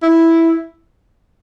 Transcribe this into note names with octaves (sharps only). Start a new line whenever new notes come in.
E4